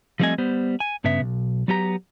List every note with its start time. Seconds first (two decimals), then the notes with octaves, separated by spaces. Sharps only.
0.20 F3 G3 A3 C4 D#5 G#5
0.38 G3 B3 C5
0.80 G#5
1.04 G2 C#3 B3 E5
1.21 B1
1.68 F#3 B3 G4 A#5